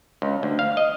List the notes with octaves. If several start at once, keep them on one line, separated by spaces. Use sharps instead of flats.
C#2
D2
F5
D#5